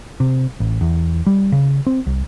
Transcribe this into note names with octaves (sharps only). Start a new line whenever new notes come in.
C3
A1
E2
G3
C#3
C4
C2